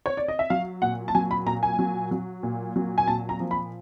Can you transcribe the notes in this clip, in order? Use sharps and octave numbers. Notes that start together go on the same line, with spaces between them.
C#5
D5
D#5
E5
F#3 F5
A#2 F#5
A5
F#3 G#5
B5
A#2 A#5
G#5
F#3
F#3
A#2
F#3
G#5
A#2 A5
A#5
F3
B5